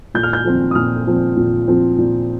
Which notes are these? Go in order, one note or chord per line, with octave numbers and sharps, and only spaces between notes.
A#2 G6
F6
G6
F3 C4
D#6
A#2 F6
F3 C4
A#2
F3 C4
A#2